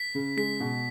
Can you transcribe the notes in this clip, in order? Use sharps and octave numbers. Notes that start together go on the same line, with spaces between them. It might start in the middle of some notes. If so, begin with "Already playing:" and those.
Already playing: B6
C#3
G#3 B6
B2